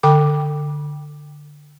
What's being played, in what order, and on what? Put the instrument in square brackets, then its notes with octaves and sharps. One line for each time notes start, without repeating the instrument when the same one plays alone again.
[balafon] D3 G5 D6